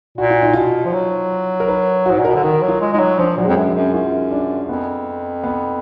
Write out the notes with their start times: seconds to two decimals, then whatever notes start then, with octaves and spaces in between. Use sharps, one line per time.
0.18 A#2 F#4
0.30 F4
0.42 D#4
0.53 B2 F4
0.85 F3
0.93 F#3
1.60 A#4
1.68 B4
2.06 F#4
2.11 G#2
2.19 A#2
2.25 A#4
2.27 B2
2.35 D3
2.43 D#3 D#4
2.62 F#3
2.68 F4
2.81 G#3
2.93 G#3 D#4
2.99 F#3
3.18 F3 D4
3.37 A#2 F#3
3.44 G#3
3.48 F2
3.57 F#2
3.69 F#3
3.75 F#2
3.94 F#2 F4
4.31 D4
4.69 F2 B3
5.44 B3